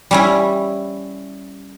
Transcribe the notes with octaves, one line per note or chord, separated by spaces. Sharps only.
G3 C#4 E4